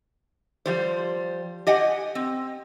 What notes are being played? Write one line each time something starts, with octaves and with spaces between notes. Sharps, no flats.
F3 G3 C5
G4 D#5 F#5 G#5
C4